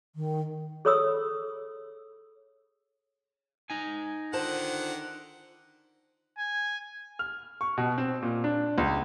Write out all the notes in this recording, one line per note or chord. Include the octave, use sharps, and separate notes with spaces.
D#3
G#4 A4 C#5 B5 D#6 E6
D#4 G#5
D3 D#3 F4 C5 F#5 A5
G#5
F6
C#6
B2
C4
A#2
D4
C#2